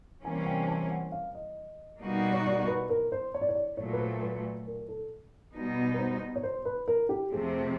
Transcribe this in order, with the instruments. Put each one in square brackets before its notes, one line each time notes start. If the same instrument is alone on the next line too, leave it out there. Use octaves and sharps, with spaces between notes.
[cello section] C3 E3 G3 A#3 C#4 [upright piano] G#5
[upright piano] G5
A5
F#5
F5
D#5
[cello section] B2 G3 A#3 D#4 F#4
[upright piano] C#5
D5
B4
A#4
C5
C#5
D5
C#5
D5
[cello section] A#2 F#3 A3 [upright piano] C#5
[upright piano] B4
C5
B4
A#4
A4
[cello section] B2 G3 B3 D#4
[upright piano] B4
C5
C#5
C5
B4
A#4
G4
[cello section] F2 C3 F3 A3 C4 [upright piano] G#4